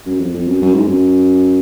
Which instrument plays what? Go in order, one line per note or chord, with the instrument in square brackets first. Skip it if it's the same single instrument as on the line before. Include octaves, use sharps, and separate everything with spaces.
[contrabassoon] F#2
F2
F2
F#2
F#2
G#2
F#2